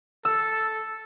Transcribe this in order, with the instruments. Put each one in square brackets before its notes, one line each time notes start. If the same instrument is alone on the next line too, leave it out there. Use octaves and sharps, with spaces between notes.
[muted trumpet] A4 [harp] E6